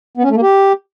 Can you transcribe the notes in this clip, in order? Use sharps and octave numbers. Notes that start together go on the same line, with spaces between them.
B3
C#4
A3
A#3
G4